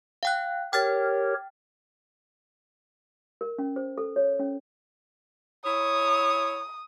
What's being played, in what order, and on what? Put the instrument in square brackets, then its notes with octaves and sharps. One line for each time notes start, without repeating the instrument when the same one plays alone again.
[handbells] F5 G5 F#6
[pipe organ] G4 A#4 C#5 [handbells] G5 F6 A6
[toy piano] A#4
C#4
C5
A4
C#5
C#4
[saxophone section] E4 C#5 [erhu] D#6